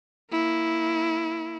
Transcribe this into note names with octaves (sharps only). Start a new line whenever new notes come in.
A#3 E4